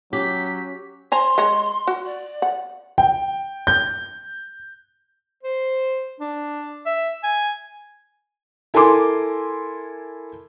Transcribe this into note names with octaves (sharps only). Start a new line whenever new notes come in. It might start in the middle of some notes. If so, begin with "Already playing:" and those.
F#3 C#4 G4 B6
C5 G#5 A#5 C6
G#3 C#5 A#5
F#4
D5
F#5
G5
G6
C5
D4
E5
G#5
E4 A4 A#4 G#5 C6 D6